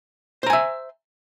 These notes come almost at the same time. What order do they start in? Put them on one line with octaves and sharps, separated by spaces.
C5 A#5 G#5 E5